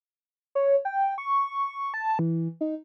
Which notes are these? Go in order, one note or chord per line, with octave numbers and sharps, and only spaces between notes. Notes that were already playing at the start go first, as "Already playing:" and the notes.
C#5
G5
C#6
A5
E3
D#4